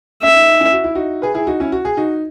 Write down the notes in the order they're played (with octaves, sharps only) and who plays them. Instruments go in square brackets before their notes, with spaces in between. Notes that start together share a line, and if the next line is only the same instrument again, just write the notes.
[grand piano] C#4 [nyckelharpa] E5
[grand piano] D#4
D#4
C#4 E4
F#4
E4
D#4 F#4
G#4 B4
E4 G#4
D#4 F#4
C#4 E4
F#4
G#4
D#4 F#4